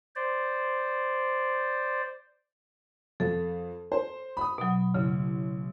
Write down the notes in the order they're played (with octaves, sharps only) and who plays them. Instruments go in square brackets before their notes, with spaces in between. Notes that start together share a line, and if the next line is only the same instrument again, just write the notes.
[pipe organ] C5 D5
[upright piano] F2 [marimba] A4
[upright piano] C5
B5 D#6
[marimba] B2 F#3
[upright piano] A1 [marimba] C#3